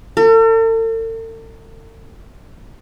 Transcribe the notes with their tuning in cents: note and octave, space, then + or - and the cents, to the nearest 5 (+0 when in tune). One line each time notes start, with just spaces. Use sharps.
A4 +45